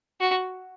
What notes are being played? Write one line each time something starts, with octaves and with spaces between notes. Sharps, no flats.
F#4